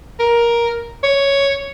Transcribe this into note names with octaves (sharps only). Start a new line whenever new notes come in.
A#4
C#5